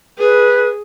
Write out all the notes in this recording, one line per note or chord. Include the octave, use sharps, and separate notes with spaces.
G#4 B4